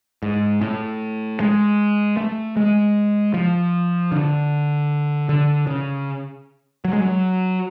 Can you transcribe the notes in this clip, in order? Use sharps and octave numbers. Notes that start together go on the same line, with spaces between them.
G#2
A2
G#3
A3
G#3
F3
D3
D3
C#3
F#3
G#3
F#3